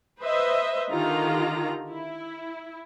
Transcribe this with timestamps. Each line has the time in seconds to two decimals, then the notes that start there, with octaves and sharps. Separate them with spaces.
0.21 B4 C5 D#5 E5
0.91 D3 D#3 F4 G4 A#5
1.90 E4